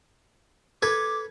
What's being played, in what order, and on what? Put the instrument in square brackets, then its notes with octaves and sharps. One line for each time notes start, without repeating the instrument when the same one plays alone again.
[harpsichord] A4 B4 [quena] D6 [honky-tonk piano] G#6